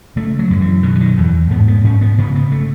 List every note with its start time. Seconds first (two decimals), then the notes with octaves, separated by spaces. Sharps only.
0.16 C#3 A3
0.39 F#3
0.50 F#2 F#3
0.61 E3
0.83 B2 D#3
0.95 E3
1.00 D#3
1.17 E2 E3
1.50 G#2 B3
1.68 B3
1.84 G#2 C#4
2.01 B3
2.18 C#3 B3
2.35 B3
2.52 A3